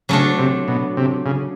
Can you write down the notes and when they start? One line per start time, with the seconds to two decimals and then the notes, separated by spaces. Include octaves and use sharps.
0.09 C#3 F#3 A3 D4
0.39 C3
0.68 B2
0.97 C3
1.26 C#3